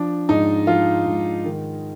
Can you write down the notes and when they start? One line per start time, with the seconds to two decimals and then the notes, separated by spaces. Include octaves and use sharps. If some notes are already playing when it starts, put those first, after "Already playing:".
Already playing: F3 D4
0.29 G#2 D#4
0.67 F3 F4
1.06 G#2
1.45 D#3